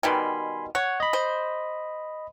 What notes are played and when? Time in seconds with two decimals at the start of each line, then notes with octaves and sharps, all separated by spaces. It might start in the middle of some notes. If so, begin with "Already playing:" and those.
0.03 B2 D#3 G3 G#5 B5 C6
0.75 C#5 F#5
1.00 D#5 B5
1.13 C5